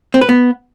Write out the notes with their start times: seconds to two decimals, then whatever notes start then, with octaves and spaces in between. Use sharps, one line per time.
0.14 C4
0.21 B4
0.29 B3